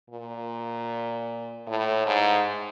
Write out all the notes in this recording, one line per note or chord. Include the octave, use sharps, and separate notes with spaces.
A#2
A2
G#2